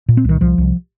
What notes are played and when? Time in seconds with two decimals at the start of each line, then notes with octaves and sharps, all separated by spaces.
0.09 A#2
0.17 C4
0.24 C2 D#3
0.41 C2 F3
0.58 C2